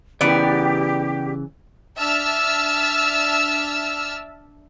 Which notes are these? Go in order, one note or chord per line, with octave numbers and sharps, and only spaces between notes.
C#3 E3 B3 G4 D5
D4 E5 A5 E6 F6